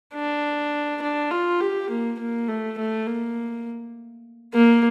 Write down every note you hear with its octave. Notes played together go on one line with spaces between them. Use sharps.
D4
D4
F4
G4
A#3
A#3
A3
A3
A#3
A#3